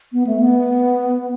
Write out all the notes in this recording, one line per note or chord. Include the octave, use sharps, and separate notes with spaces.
B3
A3
B3